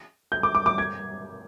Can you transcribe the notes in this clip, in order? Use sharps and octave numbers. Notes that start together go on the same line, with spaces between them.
G6
D6
D6
D6
G#6